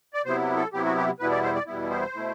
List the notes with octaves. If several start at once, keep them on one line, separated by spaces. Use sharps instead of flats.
D5
C3 F#3 B3 E4 C5
A4
C3 F#3 B3 E4 G4
F#4
G4
E2 B2 G3 B3 E4 B4
D5
C5
D5
E2 B2 G3 B3 E4
C5
B2 A3 E4